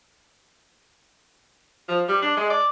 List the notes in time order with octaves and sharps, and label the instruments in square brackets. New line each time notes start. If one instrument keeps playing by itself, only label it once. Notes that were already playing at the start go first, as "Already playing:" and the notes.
[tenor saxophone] F3
G3
D4
G#3
D5